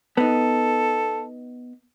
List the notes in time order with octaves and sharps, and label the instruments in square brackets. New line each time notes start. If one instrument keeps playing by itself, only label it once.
[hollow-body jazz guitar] B3 D#4 [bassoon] A4